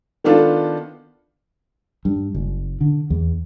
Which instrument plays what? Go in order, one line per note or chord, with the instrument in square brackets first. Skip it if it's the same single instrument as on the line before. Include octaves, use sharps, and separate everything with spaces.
[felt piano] D#3 B3 D4 F4 A4
[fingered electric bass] G2
F#1
D3
E2